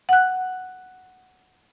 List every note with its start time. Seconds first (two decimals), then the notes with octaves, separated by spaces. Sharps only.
0.09 F#5 F#6